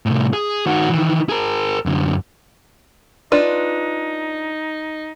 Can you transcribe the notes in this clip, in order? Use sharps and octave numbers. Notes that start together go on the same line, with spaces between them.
C2 A2
G#4
D#3 F#4
D#3 E3
G#4 A#4
F#2 D3
D4 D#4 F4 B4